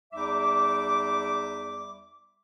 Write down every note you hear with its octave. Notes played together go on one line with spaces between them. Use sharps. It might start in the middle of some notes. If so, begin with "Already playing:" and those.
E2 G3 D#4 E5 D6